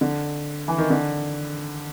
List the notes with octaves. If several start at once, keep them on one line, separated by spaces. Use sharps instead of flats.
D3
E3
D#3
D3